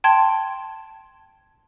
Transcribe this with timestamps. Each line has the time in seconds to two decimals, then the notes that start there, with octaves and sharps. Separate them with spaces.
0.04 G5 A5 C6 G#6